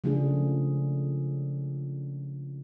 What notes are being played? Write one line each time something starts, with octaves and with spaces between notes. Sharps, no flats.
C#3 F3 A3 D4 F4 G#4